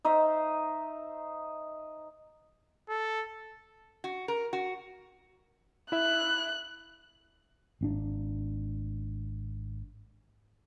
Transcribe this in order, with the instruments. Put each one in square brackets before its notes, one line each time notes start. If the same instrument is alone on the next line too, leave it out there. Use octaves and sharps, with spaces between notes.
[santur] D#4 C5 D#5 E5
[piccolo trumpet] A4
[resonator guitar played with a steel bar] F#4
A#4
F#4
[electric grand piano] E4 E5 [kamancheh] F#6
[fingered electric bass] G#1 C4 D4